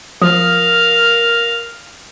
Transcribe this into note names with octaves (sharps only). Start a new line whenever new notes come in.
F3 A#4 F5 D#6